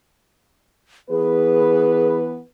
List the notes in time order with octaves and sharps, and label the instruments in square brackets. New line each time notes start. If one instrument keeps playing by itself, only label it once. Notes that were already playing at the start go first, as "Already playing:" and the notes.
[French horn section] E3 B3 B4 [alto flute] G#4